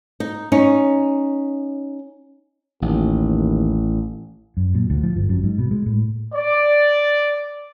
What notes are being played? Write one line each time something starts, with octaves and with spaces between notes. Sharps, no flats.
D#4
C#4 D#4
A1 D#2
F#2
A#2
D2
F3
G1
F#2
G#2
B2
G#3
A2
D5